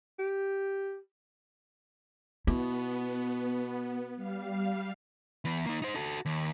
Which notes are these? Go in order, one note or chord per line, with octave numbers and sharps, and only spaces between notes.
G4
B2 B3 E4
G3 F5
E3 B3
A#3 D#4
D#4 C5
F#4 A4
D#2